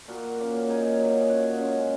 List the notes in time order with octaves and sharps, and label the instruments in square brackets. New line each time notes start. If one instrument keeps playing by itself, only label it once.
[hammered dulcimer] A#2 F#4 A#4
A#3 C#4
C#3 D#4 G#4
F#3 C#4
C#3 C#5 F#5
G#3 C#4